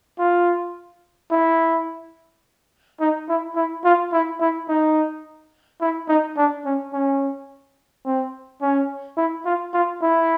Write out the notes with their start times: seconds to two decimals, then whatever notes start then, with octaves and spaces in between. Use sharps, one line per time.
0.19 F4
1.31 E4
3.00 D#4
3.29 E4
3.56 E4
3.84 F4
4.12 E4
4.40 E4
4.68 D#4
5.81 E4
6.08 D#4
6.37 D4
6.65 C#4
6.93 C#4
8.05 C4
8.61 C#4
9.17 E4
9.45 F4
9.74 F4
10.02 E4